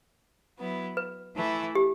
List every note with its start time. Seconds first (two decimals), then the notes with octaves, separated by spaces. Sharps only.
0.57 F#3 B3 E4
0.97 B4
1.36 E3 A3 E4
1.75 G4